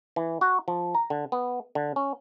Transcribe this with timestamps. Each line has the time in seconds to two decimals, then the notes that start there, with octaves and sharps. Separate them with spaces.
0.16 E3
0.41 F#4
0.68 F3
0.95 A#5
1.10 D3
1.32 B3
1.75 D3
1.96 C#4